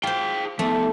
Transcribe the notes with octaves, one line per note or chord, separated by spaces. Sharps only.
F4 G#4 C5 G5
F3 A3 B3